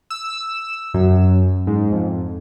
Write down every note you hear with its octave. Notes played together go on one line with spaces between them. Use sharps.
E6
F#2
G#2
F2